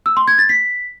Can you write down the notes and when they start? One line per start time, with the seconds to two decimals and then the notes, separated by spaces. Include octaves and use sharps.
0.06 E6
0.17 C6
0.28 G#6
0.38 A6
0.49 B6